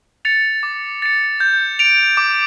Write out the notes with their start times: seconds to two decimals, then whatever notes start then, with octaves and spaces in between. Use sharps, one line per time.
0.25 A6 C#7 F7
0.63 D6
1.02 A6 C#7
1.40 G6
1.79 D7 F7
2.17 D6